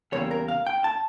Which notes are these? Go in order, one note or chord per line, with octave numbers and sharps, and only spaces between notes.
E2 C#3 G3 A#3 E4 C#5
A#4
F5
G5
A5